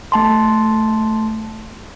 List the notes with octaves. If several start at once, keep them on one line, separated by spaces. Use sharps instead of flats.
A3 A5 C6